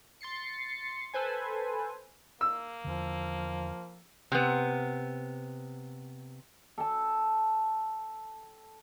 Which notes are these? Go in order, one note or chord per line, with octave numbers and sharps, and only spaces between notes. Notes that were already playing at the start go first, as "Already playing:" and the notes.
C6 A6 C7 C#7
A4 B4 C5 G#5
A#3 E6
E2 D3 F3
C3 B3
A4 G5 A5